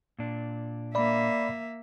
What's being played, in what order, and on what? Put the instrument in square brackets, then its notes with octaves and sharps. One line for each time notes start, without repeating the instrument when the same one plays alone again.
[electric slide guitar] A#2 D4
[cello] A#3 E5 [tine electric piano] D5 B5